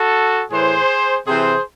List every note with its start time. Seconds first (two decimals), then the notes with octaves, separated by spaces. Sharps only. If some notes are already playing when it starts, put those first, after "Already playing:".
Already playing: F#4 A4
0.50 A2 E3 G#4 C5
1.27 C3 E3 G#4 C5